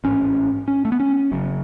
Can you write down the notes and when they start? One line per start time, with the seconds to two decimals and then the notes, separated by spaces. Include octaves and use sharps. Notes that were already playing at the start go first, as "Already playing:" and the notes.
0.04 A1 G#2 C#4
0.68 C#4
0.85 A3
0.92 B3
1.00 C#4
1.32 F#1 F#2 C#3